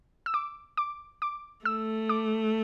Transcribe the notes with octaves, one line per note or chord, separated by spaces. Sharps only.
E6
D6
D6
D6
A3 E6
D6